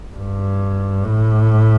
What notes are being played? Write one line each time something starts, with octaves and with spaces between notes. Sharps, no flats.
G2
A2